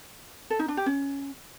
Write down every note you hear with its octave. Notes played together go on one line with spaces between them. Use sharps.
A4
D#4
D4
G4
C#4